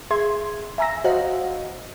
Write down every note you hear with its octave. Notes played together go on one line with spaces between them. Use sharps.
G#4 E5 C6 G#6
E5 G#5 A#5 E6 A#6
F#4 C5 D#5 F5 F#5